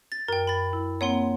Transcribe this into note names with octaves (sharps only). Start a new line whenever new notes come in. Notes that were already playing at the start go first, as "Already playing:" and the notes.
A6
F#2 A#4 G5
B5 A6
E4
A#3 C4 C#5 F#5 C6